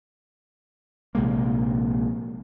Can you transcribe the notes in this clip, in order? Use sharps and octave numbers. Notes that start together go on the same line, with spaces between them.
A#1 C3 G#3 A#3